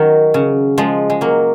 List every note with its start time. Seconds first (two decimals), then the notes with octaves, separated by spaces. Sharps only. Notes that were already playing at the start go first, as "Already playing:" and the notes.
Already playing: D#3 F#3
0.34 C#3
0.78 F3 G#3
1.10 G#3
1.21 F#3 A#3